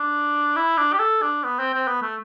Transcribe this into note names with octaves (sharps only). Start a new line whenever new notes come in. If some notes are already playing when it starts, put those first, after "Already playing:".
Already playing: D4
E4
D4
G4
A4
D4
B3
C4
C4
B3
A3